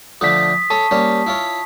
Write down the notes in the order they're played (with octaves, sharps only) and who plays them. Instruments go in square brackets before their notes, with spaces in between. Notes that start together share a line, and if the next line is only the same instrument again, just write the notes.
[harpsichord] D3 F3 A3 [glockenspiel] D#6 B6
[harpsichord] A4 C#5 [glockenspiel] A5 C#6
[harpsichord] G3 A#3 C#4
E4 F4 C#5